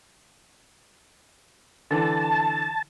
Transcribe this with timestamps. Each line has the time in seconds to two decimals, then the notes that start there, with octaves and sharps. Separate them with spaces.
1.91 D3 E3 A5